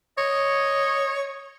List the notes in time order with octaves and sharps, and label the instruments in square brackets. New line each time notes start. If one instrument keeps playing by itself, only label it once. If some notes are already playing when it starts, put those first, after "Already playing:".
[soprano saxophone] C#5 [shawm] D#5